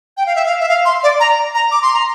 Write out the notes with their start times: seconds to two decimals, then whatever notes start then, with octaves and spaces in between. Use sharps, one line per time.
0.17 G5
0.26 F5
0.35 E5
0.46 F5
0.60 E5
0.69 F5
0.85 C6
1.03 D5
1.20 A#5
1.55 A#5
1.71 D6
1.82 C6
1.94 A#5